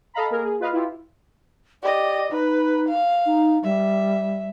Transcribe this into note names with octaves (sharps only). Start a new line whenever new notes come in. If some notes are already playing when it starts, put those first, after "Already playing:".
A4 D#5 F5 A#5 B5
A#3 G#4 A#4
G#4
F4 B4 D#5 F5
E4 F4 G4
G4 D5 D#5
D#4 B4
F5
D#4
G3 E5